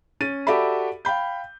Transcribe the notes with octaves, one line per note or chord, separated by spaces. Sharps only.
C#4 A6 D#7
F#4 G4 A4 D5 E5 B5
F5 G5 B5 G6